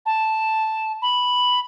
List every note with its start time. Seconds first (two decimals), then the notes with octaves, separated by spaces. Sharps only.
0.06 A5
1.02 B5